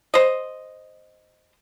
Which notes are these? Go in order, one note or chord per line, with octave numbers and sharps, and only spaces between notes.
C5 D#5